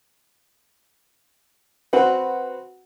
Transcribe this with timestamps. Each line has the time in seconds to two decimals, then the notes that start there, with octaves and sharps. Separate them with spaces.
1.93 C4 F#4 B4 F#5